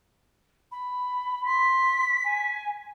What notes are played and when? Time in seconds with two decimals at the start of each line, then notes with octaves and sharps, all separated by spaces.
0.71 B5
1.45 C6 B6
2.24 G#5